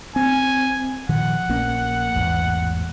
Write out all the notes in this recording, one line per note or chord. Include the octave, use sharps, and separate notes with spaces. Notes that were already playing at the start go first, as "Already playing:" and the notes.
C4 G#5
A#2 D#3 F3 F#5
A#1 A#3 C#4
A1 E2 G#2